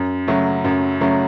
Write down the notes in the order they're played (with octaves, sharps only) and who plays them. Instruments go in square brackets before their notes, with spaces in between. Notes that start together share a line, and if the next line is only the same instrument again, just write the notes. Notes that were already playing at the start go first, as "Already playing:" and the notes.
Already playing: [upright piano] F#2
C#3 F#3 A3
F#2
C#3 F#3 A3